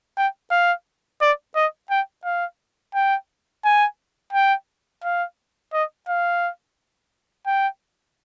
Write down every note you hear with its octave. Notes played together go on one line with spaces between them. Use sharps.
G5
F5
D5
D#5
G5
F5
G5
G#5
G5
F5
D#5
F5
G5